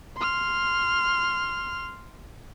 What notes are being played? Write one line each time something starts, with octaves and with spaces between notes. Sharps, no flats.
C6 F6